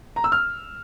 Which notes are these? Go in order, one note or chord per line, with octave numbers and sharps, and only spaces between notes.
A#5
E6
F6